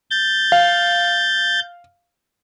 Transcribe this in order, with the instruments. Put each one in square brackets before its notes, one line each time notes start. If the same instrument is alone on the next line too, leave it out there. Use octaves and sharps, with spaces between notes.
[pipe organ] G6 A6
[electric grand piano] F5